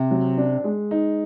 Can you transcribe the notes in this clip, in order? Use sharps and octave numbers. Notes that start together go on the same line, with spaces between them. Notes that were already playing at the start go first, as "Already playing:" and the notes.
Already playing: C3
F#3
D4
G#3
D#4